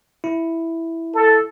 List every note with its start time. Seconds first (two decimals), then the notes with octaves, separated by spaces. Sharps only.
0.24 E4
1.15 A4